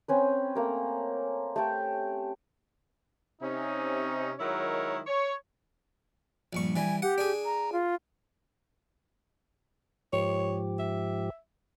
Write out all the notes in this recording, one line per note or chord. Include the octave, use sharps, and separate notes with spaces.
C4 C#4 B4
A3 A#3 A#4
A3 G4 A4 G5
C3 C#4 D#4
D#3 F#3 G#3 E4 A#4 C#5
C#5
A#1 G2 C#6
E3 G3 G#5
G4 F#5
D4 G#4
A#5
F4
G#2 F3 G4 C#5
E5